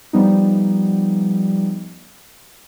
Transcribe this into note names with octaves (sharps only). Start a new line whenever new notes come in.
F3 G3 B3 D#4